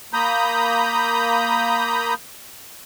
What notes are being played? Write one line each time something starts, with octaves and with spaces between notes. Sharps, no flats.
A#3 A#5 B5 D#6 G6